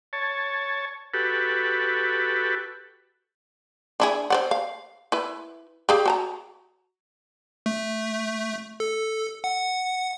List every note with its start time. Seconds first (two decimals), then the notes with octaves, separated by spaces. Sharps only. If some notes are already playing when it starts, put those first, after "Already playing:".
0.13 C#5 A5
1.14 F#4 G4 A4 B4
4.00 D4 E4 G#4
4.30 C5 D5 F#5
4.51 F5
5.12 E4 B4
5.89 G4 G#4 F5
6.06 F#4 A5 A#5
7.66 A3
8.80 A4
9.44 F#5